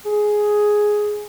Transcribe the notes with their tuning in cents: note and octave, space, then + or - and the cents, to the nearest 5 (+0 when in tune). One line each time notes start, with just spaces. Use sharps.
G#4 +5